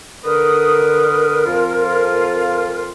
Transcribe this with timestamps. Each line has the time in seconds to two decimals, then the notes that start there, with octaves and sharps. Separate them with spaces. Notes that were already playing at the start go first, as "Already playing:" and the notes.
0.24 D3 A#4 B4 D#6
1.45 F2 F4